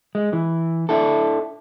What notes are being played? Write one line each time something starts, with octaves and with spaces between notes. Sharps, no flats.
G#3
E3
D4 E4 A4